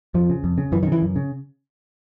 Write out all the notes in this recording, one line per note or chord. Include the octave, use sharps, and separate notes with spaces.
F2 F3
C#3
F2
C#3
F#2 E3
D#3
C#3
E3
F#2
C#3